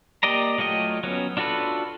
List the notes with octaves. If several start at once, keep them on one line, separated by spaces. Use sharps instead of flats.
A#3 G4 D5 D#5 A#5
F#3 A3 F4 D#5 G5
F#3 B3 C#4
D4 F4 F#4 A4 B4